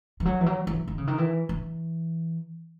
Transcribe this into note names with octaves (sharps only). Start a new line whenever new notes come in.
E3
F#3
E3
F#3
E3
D#3
C#3
D#3
E3
E3